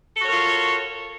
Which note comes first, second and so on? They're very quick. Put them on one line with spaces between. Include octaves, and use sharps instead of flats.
A4 F#4 C#5 A#4 F4